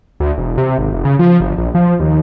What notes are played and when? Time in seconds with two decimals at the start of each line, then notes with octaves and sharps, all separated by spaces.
0.20 D2
0.38 E1
0.58 C3
0.78 G#1
0.92 F1
1.05 C#3
1.19 F3
1.40 G1
1.58 A#1
1.75 F3
2.00 D#2